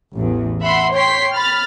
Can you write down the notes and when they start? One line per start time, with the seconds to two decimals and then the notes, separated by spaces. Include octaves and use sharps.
0.15 A1 E2
0.63 E5 F#5 B5 C6
0.95 C#5 G5 C6 B6 C7
1.34 B5 F6 A6